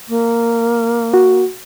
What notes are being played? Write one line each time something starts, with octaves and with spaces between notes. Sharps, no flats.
A#3
F#4